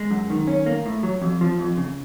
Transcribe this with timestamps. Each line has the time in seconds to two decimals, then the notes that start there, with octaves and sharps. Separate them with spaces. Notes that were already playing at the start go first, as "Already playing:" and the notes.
Already playing: G#3
0.11 F#2
0.30 D#3
0.47 C#4
0.66 A#3
0.86 A2
1.03 F#3
1.21 F2
1.41 F3
1.59 F2
1.77 C#3